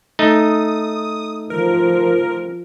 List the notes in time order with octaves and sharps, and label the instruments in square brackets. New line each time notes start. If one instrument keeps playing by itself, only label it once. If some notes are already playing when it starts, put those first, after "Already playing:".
[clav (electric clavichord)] A3 D#4 [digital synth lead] D#6
[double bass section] F3 [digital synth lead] A#4